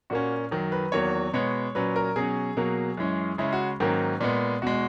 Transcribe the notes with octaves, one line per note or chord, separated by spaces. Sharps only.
A#2 A#3 C#4 F#4
F#2 D#3 F#3
B4
E2 D#3 F#3 A#3 C#5
B2 G#3 B3 C#5
A#2 F#3 C#4 B4
A#4
B2 F#3 C#4 G#4
B2 F#3 A#3
F#2 E3 G#3 C#4
C#3 G#3 C#4 E4
F#4
G#2 D#3 F#3 A#3 C#4
A#2 G#3 B3
E2 B2 G#3 F#4